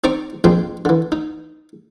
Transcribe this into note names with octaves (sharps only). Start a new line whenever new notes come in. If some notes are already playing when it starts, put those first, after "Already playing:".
C4 D#4 D5 A#5 C#6 D6
A#1 F2 F3 G#3 G5 C6
D3 E3
D#4